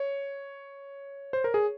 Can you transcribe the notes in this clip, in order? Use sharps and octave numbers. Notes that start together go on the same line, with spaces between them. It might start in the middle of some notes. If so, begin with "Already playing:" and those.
Already playing: C#5
C5
A#4
G#4